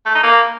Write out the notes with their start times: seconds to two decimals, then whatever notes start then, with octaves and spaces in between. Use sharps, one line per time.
0.06 A3
0.15 D#4
0.24 A#3